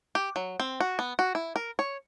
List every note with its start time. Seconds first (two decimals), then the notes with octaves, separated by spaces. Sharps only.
0.15 G4
0.36 F#3
0.60 C4
0.80 F#4
0.99 B3
1.19 F#4
1.35 E4
1.56 A#4
1.79 C#5